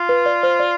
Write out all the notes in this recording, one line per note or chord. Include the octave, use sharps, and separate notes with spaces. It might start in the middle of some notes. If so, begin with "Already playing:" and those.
Already playing: F4
B4
D5
C5
D5